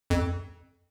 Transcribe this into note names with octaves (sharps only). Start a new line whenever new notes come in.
F2